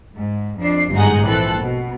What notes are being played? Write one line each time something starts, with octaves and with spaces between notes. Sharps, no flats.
G#2
F2 D4 C7
G1 G#2 G#3 D#4 G#4 F#5
A#1 E3 C4 A4 F#6
B2